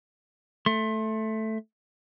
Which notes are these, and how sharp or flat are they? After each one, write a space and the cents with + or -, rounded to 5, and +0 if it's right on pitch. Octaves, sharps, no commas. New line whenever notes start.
A3 +0 C6 +35